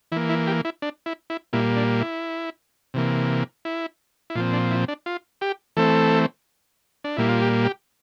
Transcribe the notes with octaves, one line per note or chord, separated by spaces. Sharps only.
E3 A#3 E4
E4
G4
E4
D4
E4
E4
A#2 G3 A#3 E4
D4
E4
C3 E3 A#3
E4
E4
A#2 F3 C4 F4
D4
E4
D4
F4
G4
E3 A3 C4 A4
D4
A#2 G3 A#3 E4
F4
G4
G4